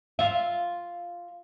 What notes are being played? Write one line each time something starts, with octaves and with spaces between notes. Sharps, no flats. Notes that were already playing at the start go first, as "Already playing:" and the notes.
F4 E5